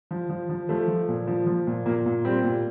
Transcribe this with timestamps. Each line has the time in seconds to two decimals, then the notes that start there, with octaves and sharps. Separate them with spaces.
0.11 F3
0.29 F3
0.49 F3
0.69 F3 A3
0.88 F3
1.09 A#2
1.27 F3
1.47 F3
1.67 A#2
1.85 A#2 A#3
2.06 A#2
2.25 G3 C4
2.44 A#2